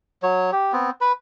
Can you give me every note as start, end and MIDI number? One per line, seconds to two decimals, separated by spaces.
0.23 0.51 54
0.23 0.51 73
0.52 0.72 67
0.72 0.90 59
0.72 0.90 60
1.01 1.12 71
1.01 1.12 83